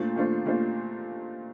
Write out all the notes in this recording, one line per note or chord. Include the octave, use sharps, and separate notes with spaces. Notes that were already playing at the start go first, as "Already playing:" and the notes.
Already playing: A#2 A3 D4 F4 C5
A#2 A3 D4 F4 C5
A#2 A3 D4 F4 C5